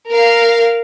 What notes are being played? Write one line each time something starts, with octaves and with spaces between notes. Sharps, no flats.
A#4 F5